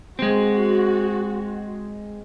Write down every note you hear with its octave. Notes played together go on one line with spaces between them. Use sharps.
G#3 C4 F#4